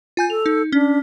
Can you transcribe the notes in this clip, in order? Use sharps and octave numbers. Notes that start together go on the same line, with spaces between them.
F4 G#5 G6
A4 F7
D#4
C#4 D4